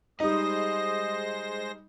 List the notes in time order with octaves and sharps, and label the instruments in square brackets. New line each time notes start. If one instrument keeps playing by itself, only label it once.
[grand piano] G3 D#4 [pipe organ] G#3 C5 A#6 [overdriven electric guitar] D#5 [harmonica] D#6